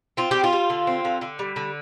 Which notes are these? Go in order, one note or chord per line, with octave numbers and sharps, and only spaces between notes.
C4 F4
G3 G4
F4
G3
D3
C4
D3
D3
G3
D3